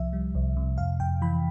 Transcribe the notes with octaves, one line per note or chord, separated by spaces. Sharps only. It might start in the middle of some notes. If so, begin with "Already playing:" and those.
Already playing: C2 F3 E5
G3
C2
C3
F2 F5
F2 G5
E3 B5